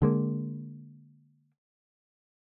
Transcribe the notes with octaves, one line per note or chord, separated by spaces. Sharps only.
D3 G#3 A#3